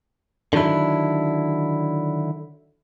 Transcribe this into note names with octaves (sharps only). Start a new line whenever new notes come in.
D3 D#3 F#3 D4 E4